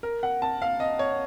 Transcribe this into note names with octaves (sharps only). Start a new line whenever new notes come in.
A#4
F#5
A5
F5
D#5
C#5